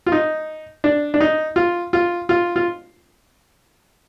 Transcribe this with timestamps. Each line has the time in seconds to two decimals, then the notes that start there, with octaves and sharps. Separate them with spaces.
0.06 F4
0.12 D#4
0.84 D4
1.14 D4
1.20 D#4
1.56 F4
1.93 F4
2.29 F4
2.56 F4